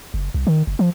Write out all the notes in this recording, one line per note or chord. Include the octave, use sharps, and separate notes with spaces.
F#1
C2
D#3
F#1
F3